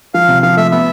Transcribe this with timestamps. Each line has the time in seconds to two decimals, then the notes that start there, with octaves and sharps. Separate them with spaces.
0.14 F3 F5
0.29 C3
0.43 F3 F5
0.57 A3 E5
0.71 B3 E5